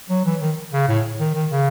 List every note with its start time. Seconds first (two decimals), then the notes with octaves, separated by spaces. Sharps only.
0.10 F#3
0.25 E3
0.41 D#3
0.73 C#3
0.89 A2
1.20 D#3
1.35 D#3
1.51 C#3